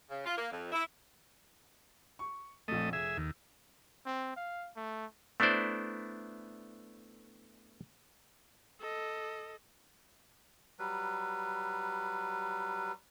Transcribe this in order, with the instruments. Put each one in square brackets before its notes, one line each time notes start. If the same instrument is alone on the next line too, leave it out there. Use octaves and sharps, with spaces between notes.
[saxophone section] C#3
F4
A#3
F2
E4
[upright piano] C#6
[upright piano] A#1 F2 [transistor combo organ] A3 D#5
[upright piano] F1 [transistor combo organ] G#4 E5
[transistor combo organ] D#2 [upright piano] E6
[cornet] C4
F5
A3
[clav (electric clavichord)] A3 B3 D4 E4 C5 D5
[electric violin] A4 D#5
[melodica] F#3 G3 B4